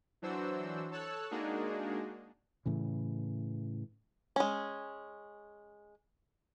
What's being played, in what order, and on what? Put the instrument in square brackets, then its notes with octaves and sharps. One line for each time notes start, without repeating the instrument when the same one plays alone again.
[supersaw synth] E3 F#3 D4 F#4 C5 E6
A4 C#5 A5 E6 F#6
G#3 A#3 D4 D#4 F#4 G#4
[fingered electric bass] A2 C#3 E3
[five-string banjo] G#3 C#4